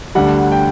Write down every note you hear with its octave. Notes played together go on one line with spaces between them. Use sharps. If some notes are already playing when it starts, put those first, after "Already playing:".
D2 D3 G3 F#5
G5